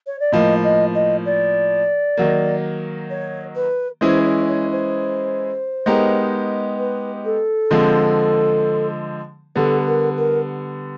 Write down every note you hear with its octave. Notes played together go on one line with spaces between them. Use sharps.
C#5
D5
A2 F3 A#3 D#5
D#5
D#5
D5
D#3 F#3 A#3
C#5
B4
E3 G#3 C#4 E4 G#4 C5
C#5
C#5
C5
G#3 B3 D#4 G4 A#4
B4
A4
D3 F3 G#3 C4
D3 G3 B3 A4
A#4
A#4